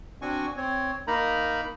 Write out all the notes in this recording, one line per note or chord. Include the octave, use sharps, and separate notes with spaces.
C4 D4 F#4 G#5 C#6
C4 C#5
A#3 D#4 A#4 A#5 B5